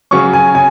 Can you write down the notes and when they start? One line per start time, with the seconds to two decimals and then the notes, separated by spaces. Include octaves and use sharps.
0.11 C#3 F#3 C#4 C#6
0.33 G#5
0.55 C#3 G#5